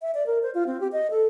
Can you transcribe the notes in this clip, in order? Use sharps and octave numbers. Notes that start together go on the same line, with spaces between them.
E5
D5
A#4
C5
F4
C4
G4
D#5
A4